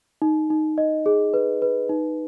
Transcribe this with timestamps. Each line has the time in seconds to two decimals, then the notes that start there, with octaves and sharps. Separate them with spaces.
0.22 D#4
0.50 D#4
0.78 D#5
1.06 G#4
1.34 B4
1.62 B4
1.89 D#4